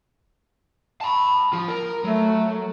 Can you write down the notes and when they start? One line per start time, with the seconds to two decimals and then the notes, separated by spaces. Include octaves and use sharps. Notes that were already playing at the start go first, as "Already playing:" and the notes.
1.01 A5 B5
1.53 F3 F4
1.68 A#4
2.04 F#3 A3